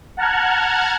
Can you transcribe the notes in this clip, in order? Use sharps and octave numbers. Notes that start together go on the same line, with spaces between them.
F#5 A5 A#5 F6 F#6 G#6